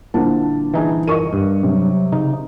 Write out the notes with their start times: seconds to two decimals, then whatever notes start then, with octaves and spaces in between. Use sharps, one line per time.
0.14 D#1 D3 F3 A#3 E4 A5
0.74 E3 D#4 G#4
1.07 A#4 D#5 C#6 D#7
1.33 G2
1.63 C3 F#3
2.12 C#3 D#4